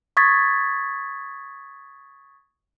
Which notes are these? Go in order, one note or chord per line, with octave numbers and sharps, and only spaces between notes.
C#6 D#6 G#6 A6 B6